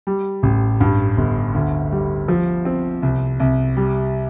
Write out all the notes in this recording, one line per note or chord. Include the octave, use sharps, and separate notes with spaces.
G3
A1
G2
G1
D2
G3
F3
C4
C2
C2
G3